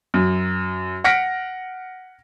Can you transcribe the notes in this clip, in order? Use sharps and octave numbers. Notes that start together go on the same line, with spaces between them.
F#2
F#5 F6 A#6 B6 C#7 D7